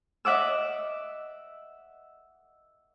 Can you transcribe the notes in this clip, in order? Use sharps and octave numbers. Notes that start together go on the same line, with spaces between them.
D#5 E5 F#5 D6 E6